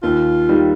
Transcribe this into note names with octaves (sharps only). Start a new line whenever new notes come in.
D#2 F4
D#3 G3